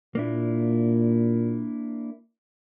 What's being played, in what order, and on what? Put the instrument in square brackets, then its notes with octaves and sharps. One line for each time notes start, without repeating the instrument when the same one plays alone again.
[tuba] A#2 [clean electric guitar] A#3 D4 E4